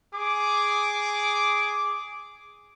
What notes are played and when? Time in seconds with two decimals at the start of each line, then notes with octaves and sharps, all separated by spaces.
0.15 G#4 D6